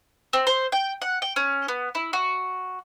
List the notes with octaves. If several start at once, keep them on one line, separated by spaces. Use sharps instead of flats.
C4
C5
G5
F#5
G5
C#4
B3
E4
F#4